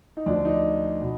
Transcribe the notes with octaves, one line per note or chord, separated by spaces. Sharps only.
D#4
D2 D3 F3 D4
D#4
B2